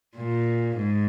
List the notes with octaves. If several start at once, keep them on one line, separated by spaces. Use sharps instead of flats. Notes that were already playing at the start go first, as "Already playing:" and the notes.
A#2
G#2